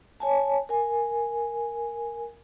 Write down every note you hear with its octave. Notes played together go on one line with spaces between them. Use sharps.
C#5 G#5 A5
A#4 G#5